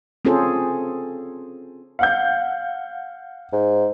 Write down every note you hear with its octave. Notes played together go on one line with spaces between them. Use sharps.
C4 C#4 F4 G#4 A4 C5
F5 F#5 G6
G#2